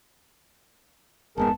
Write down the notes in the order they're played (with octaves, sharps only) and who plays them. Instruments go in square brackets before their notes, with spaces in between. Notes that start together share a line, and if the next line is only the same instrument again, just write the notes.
[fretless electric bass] F1 G#3 B3 [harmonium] G#2 G#4 A#4 [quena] A5